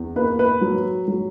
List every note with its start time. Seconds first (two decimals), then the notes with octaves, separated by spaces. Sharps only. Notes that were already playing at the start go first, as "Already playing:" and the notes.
Already playing: E2
0.16 A#3 B4
0.39 B4
0.61 F#3
1.08 F#3